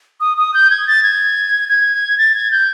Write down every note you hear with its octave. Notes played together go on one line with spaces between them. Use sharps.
D#6
D#6
G6
G#6
A6
G#6
G#6
G#6
A6
G#6
G6